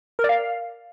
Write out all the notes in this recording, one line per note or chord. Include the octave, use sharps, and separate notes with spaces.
A#4
D5
F5